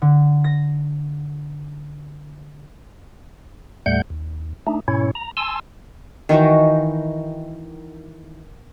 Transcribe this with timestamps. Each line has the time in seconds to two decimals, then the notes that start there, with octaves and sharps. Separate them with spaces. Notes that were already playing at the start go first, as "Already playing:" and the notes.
0.02 D3
0.44 A#6
3.86 D#2 A2 G3 A3 F#5 G6
4.10 D#2
4.67 A3 D4 D#4
4.88 G#2 B2 C#4 E4 C#5
5.15 A#5
5.37 G#5 A5 C6 E6
6.29 D#3 E3 D#4 F#4